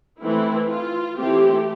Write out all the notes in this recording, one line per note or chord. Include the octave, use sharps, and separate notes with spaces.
E3 A3 C4 E4
F4
E3 A3 C4 G4